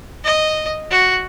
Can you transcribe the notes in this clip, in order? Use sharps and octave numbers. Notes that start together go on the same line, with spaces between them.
D#5
F#4